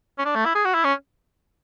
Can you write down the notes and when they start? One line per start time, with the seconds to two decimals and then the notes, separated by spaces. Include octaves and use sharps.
0.18 C#4
0.25 D4
0.35 A3
0.45 E4
0.55 G#4
0.65 F#4
0.75 E4
0.84 C#4